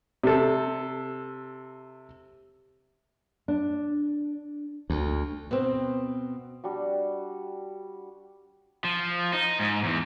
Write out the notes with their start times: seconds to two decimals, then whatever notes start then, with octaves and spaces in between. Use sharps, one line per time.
0.23 C3 A4
3.48 D4
4.90 D2
5.51 B2 C4
6.64 G3 D4 F#4
8.84 F3
9.33 D#4
9.60 G#2
9.85 E2